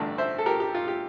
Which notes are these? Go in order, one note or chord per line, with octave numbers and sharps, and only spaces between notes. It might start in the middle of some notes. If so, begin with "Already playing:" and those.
Already playing: A1 G2 D3 A3 D4
C5 E5
A4
G4 A#4
G4
F4
G4